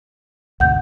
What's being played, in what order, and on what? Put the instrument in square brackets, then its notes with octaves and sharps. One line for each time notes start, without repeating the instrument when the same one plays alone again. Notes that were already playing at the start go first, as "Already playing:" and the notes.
[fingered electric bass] D2 G#2 C3 [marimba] F#5 G6